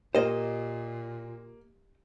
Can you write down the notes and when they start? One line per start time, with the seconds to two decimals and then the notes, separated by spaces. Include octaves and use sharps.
0.15 A#2 A#3 G4 C5 D#5